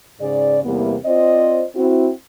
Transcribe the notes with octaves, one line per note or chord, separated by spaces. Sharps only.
G#2 C#3 G#4 D5
E2 C3 E3 G3 A#3 B3
C4 F4 C5 D5 D#5
C4 E4 F#4